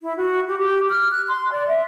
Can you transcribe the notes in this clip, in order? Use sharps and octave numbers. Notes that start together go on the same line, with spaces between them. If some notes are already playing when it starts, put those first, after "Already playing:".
E4
F#4
G4
G4
F6
F#6
C6
D5
E5